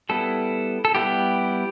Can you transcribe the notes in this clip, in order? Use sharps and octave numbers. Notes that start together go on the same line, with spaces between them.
G3 B3 E4 A4
A4
G3 B3 E4 G4